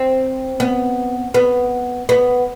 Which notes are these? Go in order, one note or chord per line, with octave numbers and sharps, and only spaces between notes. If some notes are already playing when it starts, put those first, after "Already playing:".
Already playing: C4
B3
B3
B3